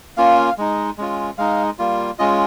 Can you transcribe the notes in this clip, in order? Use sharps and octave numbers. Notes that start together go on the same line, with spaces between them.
A#3 C#4 F4 F5
G#3 D#4
G#3 C#4 F4
G#3 D#4 F5
G3 A#3 F4
G#3 C#4 F4 D#5